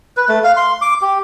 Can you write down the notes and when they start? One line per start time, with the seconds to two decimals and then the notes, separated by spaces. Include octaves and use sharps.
0.17 B4
0.29 A3
0.44 F5
0.57 C6
0.82 D6
1.02 G4